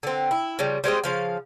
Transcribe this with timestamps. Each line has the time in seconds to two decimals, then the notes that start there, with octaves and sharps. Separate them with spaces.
0.03 D3 C4
0.31 E4
0.59 C#3 F3 G3
0.84 G3 G#3 C4 D#5
1.04 C#3 F3 F5